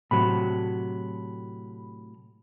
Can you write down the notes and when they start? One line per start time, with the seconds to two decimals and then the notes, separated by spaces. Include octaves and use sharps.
0.11 A2 C3 F#3 B5